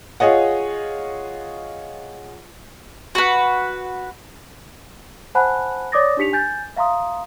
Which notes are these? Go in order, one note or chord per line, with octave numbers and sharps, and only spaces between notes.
F4 G#4 C#5 D#5 F#5
F#4 B4
C5 F#5 G#5 A5 B5 F#6
C#5 D5 D6 D#6 A6 A#6
D4 D#4 G4 B6 C#7 F7
G#5 G6 A6
E5 F5 A#5 C6 D#6